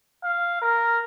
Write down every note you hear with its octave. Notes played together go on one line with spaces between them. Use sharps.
F5
A#4